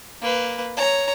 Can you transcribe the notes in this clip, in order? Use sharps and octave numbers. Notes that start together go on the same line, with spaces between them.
A#3 B4
C#5 A#5